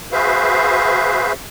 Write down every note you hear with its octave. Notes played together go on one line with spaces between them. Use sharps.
F#4 G#4 B4 C5 E5 F5